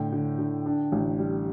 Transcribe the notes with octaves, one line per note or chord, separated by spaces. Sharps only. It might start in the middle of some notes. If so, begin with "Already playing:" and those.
Already playing: A2 D3 G5
D3
D3
D4
A1
G3